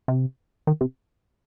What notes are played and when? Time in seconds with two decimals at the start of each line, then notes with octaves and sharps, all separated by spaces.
0.08 C3
0.67 D#3
0.81 C3